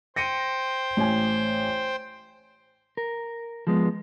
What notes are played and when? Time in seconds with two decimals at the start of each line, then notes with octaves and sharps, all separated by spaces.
0.16 C5 G5 A#6 C#7 D#7
0.97 A1 G#5
2.97 A#4
3.67 F3 G#3 B3